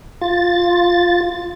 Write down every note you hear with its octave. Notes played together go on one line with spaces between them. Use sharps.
F4 A6